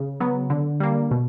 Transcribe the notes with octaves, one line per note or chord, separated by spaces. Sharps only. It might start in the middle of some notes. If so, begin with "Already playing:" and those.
Already playing: C#3
F#3 B3
D3
G3 A#3
B2